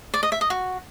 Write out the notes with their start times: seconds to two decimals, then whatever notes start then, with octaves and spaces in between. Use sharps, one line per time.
0.14 D5
0.23 D#5
0.32 E5
0.41 D#5
0.50 F#4